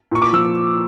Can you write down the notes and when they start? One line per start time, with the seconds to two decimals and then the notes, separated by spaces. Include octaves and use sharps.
0.11 A#2 C#6
0.22 D6
0.33 F3 E6